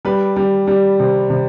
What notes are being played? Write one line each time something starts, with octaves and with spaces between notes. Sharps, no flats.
G3 B4
G3
G3
C3
C3